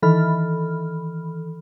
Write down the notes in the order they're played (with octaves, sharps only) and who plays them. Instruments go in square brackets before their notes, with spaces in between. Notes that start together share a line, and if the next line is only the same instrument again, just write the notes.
[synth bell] D#3 E3 A4 B5 F6